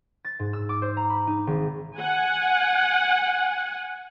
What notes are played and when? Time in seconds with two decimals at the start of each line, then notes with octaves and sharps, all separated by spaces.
0.25 A6
0.39 G#2
0.53 E6
0.69 D6
0.82 C5
0.97 A#5
1.10 B5
1.27 D#4
1.47 G#1
1.96 F#5 G#5